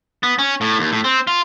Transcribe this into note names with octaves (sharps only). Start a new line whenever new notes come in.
B3
C#4
A2
D#2
A2
C4
F4